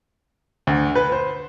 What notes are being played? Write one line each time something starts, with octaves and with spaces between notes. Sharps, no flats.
D2
B4
C5